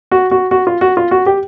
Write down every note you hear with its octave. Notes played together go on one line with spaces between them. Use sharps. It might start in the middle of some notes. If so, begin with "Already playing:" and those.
F#4
F#4
F#4
F4
F#4
F4
F#4
G4